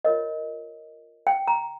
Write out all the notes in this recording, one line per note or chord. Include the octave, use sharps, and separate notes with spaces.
F4 A#4 C#5 D#5
G5
A#5